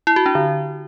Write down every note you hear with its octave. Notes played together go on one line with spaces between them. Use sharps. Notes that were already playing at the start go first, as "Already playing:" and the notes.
E4
F#4
D4
D3